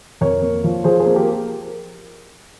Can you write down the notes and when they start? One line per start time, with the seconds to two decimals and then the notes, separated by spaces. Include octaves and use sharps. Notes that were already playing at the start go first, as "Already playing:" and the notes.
0.21 F2 A#4 C#5
0.42 A#3
0.64 F3
0.84 F3 G#4 C5
1.00 G#4 C5
1.06 A#3
1.16 G4 A#4